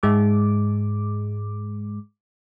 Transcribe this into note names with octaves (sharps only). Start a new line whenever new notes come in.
G#2 G#3 D6